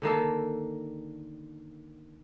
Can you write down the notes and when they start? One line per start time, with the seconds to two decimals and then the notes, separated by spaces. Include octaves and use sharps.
0.02 D3 D#3 A#3 A4